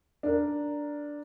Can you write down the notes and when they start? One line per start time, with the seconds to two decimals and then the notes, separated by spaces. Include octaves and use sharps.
0.23 D4 A#4